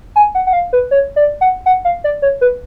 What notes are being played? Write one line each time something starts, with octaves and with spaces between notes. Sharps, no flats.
G#5
F#5
F#5
F5
B4
C#5
D5
F#5
F#5
F5
D5
C#5
B4